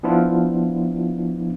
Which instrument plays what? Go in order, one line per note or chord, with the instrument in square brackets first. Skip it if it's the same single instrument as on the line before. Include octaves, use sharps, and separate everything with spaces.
[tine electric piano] F3 B3 D4 E4 F4